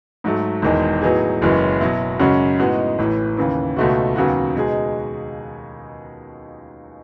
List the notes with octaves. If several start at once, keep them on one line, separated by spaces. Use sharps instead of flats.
G#2 F#3 A3
E1 E2 D#3 G#3
A2 F#3 B3 D#4 G#4
F#1 F#2 E3 G#3 C#4
B2 F#3 B3 E4
F#2 C#3 G#3 C#4 F#4
A2 G#3 B3 D#4 F#4
A1 A2 E3
D#2 C#3 E3
C#2 B2 A3 D#4 F#4
D#2 C#3 F#3 B3 F#4
B2 G#3 D#4 G#4